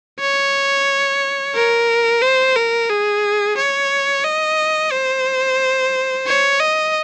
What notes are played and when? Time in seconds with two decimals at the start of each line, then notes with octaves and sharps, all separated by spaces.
0.20 C#5
1.55 A#4
2.22 C5
2.56 A#4
2.90 G#4
3.57 C#5
4.24 D#5
4.92 C5
6.26 C#5
6.60 D#5